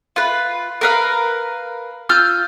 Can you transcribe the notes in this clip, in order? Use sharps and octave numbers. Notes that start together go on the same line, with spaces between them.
F4 B4
A#4 B4 F5
F4 E6 F6 G6